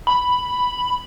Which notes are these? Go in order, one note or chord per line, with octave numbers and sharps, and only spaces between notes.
B5